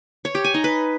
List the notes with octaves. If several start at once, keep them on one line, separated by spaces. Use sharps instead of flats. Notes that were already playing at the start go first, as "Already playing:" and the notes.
C#5
G4
G#5
D#4
B4